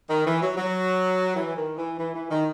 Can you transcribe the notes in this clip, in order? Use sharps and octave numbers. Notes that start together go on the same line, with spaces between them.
D#3
E3
F#3
F#3
E3
D#3
E3
E3
E3
D#3